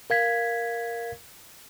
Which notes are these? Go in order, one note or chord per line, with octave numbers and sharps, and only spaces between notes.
A#4 F5 G#6 B6